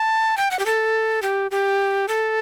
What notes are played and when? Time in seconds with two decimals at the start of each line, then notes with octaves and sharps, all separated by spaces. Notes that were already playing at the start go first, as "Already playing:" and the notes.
Already playing: A5
0.37 G5
0.51 F#5
0.59 G4
0.66 A4
1.22 G4
1.51 G4
2.08 A4